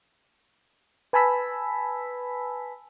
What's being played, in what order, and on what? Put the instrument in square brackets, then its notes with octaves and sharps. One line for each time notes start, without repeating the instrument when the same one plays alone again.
[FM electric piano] B4 G#5 A5 B5 E6 B6